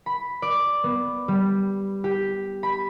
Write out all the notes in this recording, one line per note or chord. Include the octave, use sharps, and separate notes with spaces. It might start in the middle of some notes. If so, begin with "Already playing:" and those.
B5
D5
B3
G3
G4
B5